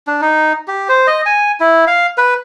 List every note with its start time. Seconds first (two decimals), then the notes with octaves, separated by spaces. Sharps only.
0.07 D4
0.21 D#4
0.68 G4
0.89 C5
1.07 D#5
1.26 G#5
1.60 E4
1.87 F5
2.18 B4